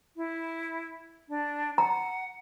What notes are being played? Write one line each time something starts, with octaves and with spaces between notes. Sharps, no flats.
E4
D4
F#5 A#5